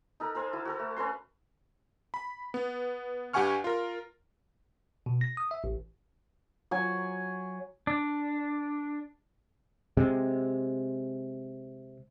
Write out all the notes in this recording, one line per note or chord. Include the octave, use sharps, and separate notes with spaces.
D#4 A4 A#4
A4 A#4 C5 G#5
E4 F#4
F#4 A4 A#4
A3
C#4 A4 B4 C6
B5
B3
G2 G4 F#5 G#5 C#6 F6
F4 A#4
B2
A#6
D#6
E5
A1
F#3 G#5
D4
C3 G#3